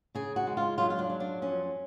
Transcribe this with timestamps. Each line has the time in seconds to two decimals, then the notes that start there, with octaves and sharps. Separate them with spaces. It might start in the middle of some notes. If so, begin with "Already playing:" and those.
0.15 C#3 G#4
0.36 F#4
0.47 G#3
0.57 F4
0.78 F#3 F4
0.90 F4
0.99 D4
1.10 F#3
1.20 D4
1.42 F2 C#4